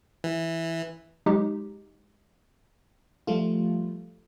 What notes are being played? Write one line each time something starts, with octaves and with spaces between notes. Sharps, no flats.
E3
F#3 G#3 D#4 G4
F3 G3 A3 F4